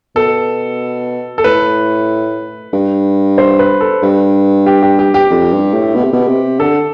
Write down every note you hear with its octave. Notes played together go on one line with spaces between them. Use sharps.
B2 A4
A4
A2 B4
G2
C5
B4
A4
G2
G4
G4
G4
G4
F2
G2
A2
B2
C3
B2
C3
D3 A4